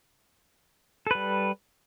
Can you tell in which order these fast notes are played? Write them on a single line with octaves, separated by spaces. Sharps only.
A4 B4 G3